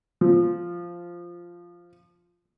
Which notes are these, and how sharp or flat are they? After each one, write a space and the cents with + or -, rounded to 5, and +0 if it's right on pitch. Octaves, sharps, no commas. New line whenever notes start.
F3 -5